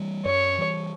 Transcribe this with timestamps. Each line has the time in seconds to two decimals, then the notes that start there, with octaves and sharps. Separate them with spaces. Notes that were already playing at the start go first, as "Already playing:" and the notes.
Already playing: E3 G3
0.25 F#2 C#5
0.58 E3 G3